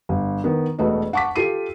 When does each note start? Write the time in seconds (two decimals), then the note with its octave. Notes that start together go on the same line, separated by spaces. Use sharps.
0.09 G1
0.44 D#3 B3
0.78 E1 A3 F#4 B4 D#5
1.13 F#5 A5 C#6 D6 B6
1.36 F4 G4 A4 C7 D#7